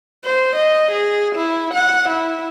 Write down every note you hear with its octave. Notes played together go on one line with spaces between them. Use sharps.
C5
D#5
G#4
E4
F#5
E4